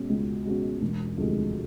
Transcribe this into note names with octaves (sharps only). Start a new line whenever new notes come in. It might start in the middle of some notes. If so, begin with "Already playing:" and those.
Already playing: B2 G#3 C#4 F#4
C#2
B2 G#3 C#4 F#4
E1
D2 C3 F3 G#3